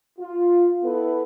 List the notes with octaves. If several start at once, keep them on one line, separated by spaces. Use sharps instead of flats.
F4
B3 E4 A4 B4